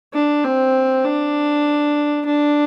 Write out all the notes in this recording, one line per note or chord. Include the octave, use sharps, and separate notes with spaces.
D4
C4
D4
D4